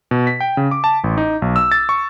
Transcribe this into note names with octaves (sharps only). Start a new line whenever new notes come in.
B2
B6
G5
C#3
D6
A5
A1
D#4
B1
E6
A6
C#6